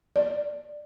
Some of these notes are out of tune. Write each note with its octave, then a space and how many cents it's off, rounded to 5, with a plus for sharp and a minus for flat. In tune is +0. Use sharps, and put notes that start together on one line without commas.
D5 +10